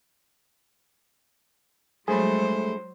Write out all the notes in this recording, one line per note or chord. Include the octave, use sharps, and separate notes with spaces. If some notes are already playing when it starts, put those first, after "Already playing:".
G2 F#3 G#3 A3 G#4 C5 B5